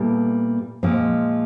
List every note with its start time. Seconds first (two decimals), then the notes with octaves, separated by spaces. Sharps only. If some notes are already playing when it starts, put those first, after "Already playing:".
Already playing: A#2 G3 B3 E4 A4
0.83 A#2 F3 G#3 C4